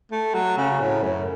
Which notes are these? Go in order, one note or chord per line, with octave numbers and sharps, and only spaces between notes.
A3
F#3
C#3
A2
F#2